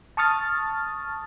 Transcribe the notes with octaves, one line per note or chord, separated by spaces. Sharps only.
A5 C#6 D#6 F6 A6